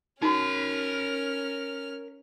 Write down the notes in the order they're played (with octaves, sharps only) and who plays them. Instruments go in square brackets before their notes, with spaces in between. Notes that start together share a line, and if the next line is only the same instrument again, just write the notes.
[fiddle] C#4 F6 [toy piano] D#4 F#4 [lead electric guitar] A#4 B5